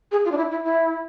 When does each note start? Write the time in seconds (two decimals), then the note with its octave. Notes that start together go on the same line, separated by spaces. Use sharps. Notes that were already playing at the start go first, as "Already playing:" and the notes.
0.12 G#4
0.25 F4
0.32 D4
0.37 E4
0.51 E4
0.64 E4